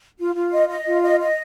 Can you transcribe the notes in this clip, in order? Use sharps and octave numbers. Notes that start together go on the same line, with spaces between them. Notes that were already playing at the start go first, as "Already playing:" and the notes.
F4
F4
D#5
D#5
F4
D#5
D#5